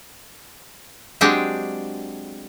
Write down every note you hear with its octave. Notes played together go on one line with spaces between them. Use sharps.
F#3 G#3 C4 D4 G4 G#4